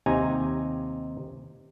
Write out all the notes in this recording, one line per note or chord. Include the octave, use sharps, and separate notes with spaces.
D#2 C3 D#4 G#5 A#5